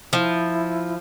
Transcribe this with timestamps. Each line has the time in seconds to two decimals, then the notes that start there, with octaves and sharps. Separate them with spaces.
0.13 F3 E4